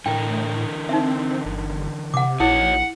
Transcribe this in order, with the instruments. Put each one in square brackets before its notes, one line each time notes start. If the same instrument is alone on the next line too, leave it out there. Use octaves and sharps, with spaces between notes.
[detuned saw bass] A2 [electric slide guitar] D3 E3 A#4 [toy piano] G5
[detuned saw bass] C4 [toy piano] D#4 E5
[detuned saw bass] G1
[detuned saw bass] C3 [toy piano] F#5 D6
[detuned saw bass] A#1 [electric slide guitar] D#4 F#4 C#5 [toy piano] E4 [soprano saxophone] F#5